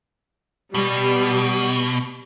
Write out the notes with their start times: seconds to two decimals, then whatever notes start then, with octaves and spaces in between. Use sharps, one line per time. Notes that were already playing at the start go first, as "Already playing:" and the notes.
0.75 B2 G3